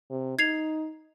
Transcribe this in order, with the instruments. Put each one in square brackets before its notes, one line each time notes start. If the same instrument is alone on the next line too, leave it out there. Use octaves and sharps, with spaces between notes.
[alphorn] C3
[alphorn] D#4 [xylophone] G#6 C7 F7